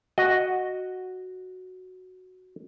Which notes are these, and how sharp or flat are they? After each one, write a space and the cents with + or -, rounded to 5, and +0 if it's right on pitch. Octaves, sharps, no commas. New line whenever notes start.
F#4 +0 D#5 -5